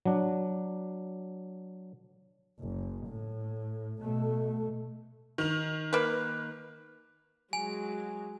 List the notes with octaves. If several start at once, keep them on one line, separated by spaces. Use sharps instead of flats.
F#3 D4
F#1
A2
B2 A3
D#3 F7
A#3 B4
F#3 G#3 G#5